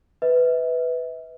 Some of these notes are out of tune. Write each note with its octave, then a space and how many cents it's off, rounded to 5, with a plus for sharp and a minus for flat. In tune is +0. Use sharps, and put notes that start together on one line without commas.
B4 +10 E5 -35